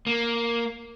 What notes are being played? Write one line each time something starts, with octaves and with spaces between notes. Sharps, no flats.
A#3